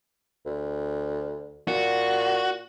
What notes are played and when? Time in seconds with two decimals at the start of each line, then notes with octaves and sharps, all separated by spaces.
0.46 D2
1.68 A#2 F#4